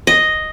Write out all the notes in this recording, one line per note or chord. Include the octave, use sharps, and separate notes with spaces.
D#5